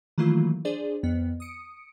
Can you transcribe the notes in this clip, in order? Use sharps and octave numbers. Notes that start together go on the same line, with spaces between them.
D#3 E3 F#3 A3 A#3 F4
D4 G#4 C5 D5
F2 B3
D#6 C#7 D7